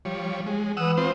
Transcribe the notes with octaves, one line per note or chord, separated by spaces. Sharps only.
F3 G3 C#5
G#3
E3 F#5 D#6 E6
C4 F4 C5